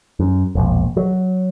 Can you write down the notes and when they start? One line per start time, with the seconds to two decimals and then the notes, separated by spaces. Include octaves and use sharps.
0.19 F#2
0.55 E1 A#1
0.97 F#3